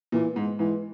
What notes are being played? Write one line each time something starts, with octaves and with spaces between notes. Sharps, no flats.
A#2 E3
G#2
G#2 E3